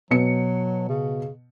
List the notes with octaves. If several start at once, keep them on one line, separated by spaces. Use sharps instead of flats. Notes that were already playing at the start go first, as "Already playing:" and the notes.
B2 F#3 C#7
C#3